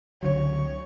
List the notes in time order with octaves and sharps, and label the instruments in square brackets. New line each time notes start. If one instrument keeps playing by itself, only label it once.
[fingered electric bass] C#2 D3 F#3 [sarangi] C#5